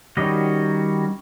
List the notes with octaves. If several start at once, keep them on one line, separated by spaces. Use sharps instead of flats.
D#3 G3 C#4 F#4 D#5